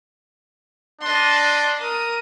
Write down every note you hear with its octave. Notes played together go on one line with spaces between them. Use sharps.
D4 D#5 C6
A#4 D#6